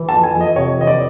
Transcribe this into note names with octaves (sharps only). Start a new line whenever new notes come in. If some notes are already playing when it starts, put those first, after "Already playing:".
Already playing: E3
A5
F2
G#5
F2
D#5
C3 C#5
E3 D#5
D5